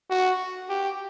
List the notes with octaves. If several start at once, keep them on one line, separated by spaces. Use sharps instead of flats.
F#4
G4